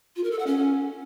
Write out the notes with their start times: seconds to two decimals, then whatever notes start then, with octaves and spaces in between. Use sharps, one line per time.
0.16 F4
0.24 A#4
0.31 A4
0.39 F#5
0.47 C#4